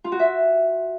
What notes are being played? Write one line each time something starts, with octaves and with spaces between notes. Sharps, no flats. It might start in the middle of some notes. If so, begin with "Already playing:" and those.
F4
F#4
E5